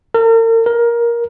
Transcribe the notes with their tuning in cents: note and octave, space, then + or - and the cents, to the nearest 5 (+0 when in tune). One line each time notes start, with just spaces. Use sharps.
A#4 -40
A#4 +15